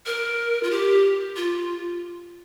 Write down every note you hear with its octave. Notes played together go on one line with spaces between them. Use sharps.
A#4
F4
G4
F4